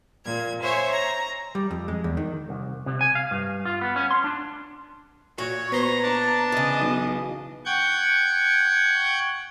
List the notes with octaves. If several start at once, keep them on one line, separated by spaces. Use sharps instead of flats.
A#2 G#6
C5 C#5 E5 G#5
A#5
G3
F2
G#3
E2
D#3
C2
C3
G#5
F5
G2
F4
B3
C#4
C6
D4
A#2 F#4 C#5
B3 C5 A#5
D4 A5 A#5
C#3 E3 D#5
B1
F#5 G5 C#6 G6 G#6